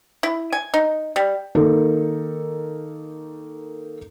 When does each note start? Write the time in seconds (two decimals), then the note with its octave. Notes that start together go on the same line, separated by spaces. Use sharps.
0.23 E4
0.52 G#5
0.74 D#4
1.16 G3
1.55 D#3 A#3 D#4 A4 A#4